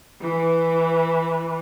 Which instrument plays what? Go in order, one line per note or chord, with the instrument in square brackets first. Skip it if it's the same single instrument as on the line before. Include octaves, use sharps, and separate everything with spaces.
[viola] E3